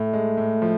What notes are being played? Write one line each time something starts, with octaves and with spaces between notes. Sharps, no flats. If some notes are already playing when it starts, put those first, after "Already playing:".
Already playing: A2 A3
G#3
A2
F3